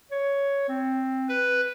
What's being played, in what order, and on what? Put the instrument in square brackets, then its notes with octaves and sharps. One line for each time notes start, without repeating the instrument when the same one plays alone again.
[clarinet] C#5
C4
[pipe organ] B4